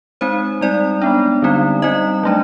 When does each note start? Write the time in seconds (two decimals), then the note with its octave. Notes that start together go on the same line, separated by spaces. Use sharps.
0.21 G#3 C4 D#4 C5
0.61 G3 C4 D#4 D5
1.02 G#3 B3 D4
1.42 D3 G3 C4 D#4
1.82 G3 C4 D#4 D#5
2.23 F#3 A3 D4